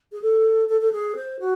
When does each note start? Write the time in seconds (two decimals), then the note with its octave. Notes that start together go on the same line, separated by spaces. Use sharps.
0.12 G#4
0.22 A4
0.69 A4
0.81 A4
0.92 G#4
1.16 C5
1.40 F#4